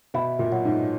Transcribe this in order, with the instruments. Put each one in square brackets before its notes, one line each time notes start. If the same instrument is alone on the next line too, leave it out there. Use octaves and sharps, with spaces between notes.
[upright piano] B2 [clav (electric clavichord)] E4
[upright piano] A#2
[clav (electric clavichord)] F#3
[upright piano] G#2